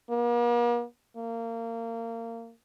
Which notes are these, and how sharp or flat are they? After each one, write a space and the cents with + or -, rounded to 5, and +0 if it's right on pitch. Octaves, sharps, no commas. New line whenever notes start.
A#3 +45
A#3 -25